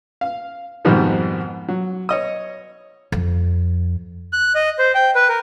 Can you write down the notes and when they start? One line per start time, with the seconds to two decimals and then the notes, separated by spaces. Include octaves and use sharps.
0.21 F5
0.85 F2 G#2 B2 D#3 F3 G3
1.68 F#3
2.09 C#5 D#5 D#6
3.12 F2
4.33 F#6
4.55 D#5
4.79 C5
4.95 G5
5.15 B4
5.29 A#4